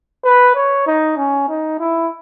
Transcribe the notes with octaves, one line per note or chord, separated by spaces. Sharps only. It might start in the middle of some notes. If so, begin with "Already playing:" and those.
B4
C#5
D#4
C#4
D#4
E4